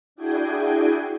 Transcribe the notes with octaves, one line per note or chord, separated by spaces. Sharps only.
D4 E4 F#4 G#4 G5 G#5